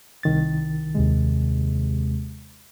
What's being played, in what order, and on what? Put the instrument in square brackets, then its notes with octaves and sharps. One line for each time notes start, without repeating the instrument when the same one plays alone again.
[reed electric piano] C2 D#3 A6
[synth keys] D#2 C3 G#3